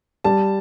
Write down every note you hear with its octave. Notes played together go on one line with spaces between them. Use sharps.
G3 A5